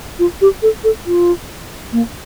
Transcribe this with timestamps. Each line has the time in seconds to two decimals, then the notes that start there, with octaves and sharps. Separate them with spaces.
0.19 F4
0.41 G4
0.62 A4
0.84 A4
1.06 F4
1.92 A#3